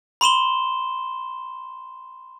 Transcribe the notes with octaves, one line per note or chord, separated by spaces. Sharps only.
B5 C6 E7 G7